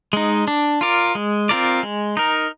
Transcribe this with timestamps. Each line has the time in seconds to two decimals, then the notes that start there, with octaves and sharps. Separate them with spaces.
0.13 G#3 D#4
0.48 D4
0.81 F4 A#4 D5
1.15 G#3
1.49 C4 F4 A#4 D5
1.83 G#3
2.17 D#4 A#4